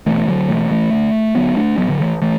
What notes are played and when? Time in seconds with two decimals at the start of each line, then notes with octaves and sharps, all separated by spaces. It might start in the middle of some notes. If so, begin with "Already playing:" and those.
0.06 B1 B2 E3 A3
0.28 D3 F#3
0.49 B1 B2 E3 A3
0.71 E3 A3
0.92 D2 D3
1.35 D2 D3 F#3 B3
1.56 A3 D4
1.78 A1 A2 F#3 B3
1.89 D3 F#3
2.00 E3 A3
2.22 E3 A3